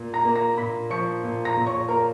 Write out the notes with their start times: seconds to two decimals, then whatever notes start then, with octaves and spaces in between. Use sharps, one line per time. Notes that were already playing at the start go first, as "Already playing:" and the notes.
Already playing: A#2
0.14 A#5 A#6
0.25 A#3
0.36 A#5 A#6
0.57 A#2 B5 B6
0.90 F3 C#6 C#7
1.24 A#2
1.45 A#5 A#6
1.57 A#2
1.67 C#5 C#6
1.88 A#3 A#4 A#5